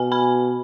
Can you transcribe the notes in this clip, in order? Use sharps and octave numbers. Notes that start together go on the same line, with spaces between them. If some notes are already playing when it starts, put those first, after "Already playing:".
Already playing: B2 G#5
G#5 B5